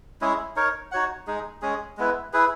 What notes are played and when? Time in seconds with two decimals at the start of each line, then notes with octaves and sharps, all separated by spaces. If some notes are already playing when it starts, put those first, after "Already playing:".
0.21 G#3 C#4 E4 G#4
0.56 D#4 A#4 C#5
0.92 D#4 F#4 C#5 F#5
1.27 G#3 D#4 G#4
1.62 G#3 C#4 G#4
1.98 G#3 B3 E4 B4
2.33 E4 G#4 B4